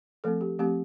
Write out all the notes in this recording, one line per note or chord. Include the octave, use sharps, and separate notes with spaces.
F3 A3 C4 A4
G4
F3 A3 C4 G4